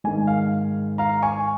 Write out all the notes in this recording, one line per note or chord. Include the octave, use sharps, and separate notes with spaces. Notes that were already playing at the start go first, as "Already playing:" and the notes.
G#1 G#2 D#3 G#5
F5
F5 A#5
G#5 C#6